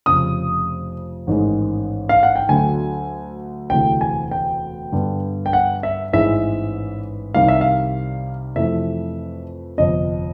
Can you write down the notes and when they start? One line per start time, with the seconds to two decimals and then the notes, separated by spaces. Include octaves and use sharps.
0.06 F1 F2 C#3 D#6
1.27 A1 G#2 D#3 G#3
2.09 F5
2.23 F#5
2.36 G5
2.49 D2 D3 F#3 A3 G#5
3.70 E1 D2 C3 E3 A3 G5
4.01 G#5
4.31 G5
4.92 G2 D3 G3 B3
5.46 G5
5.53 F#5
5.83 E5
6.13 A1 G#2 E3 G#3 E5
7.34 C2 C3 D#3 G3 F5
7.48 E5
7.61 F5
8.56 F2 C3 E3 A3 E5
9.78 G1 F2 C3 D#5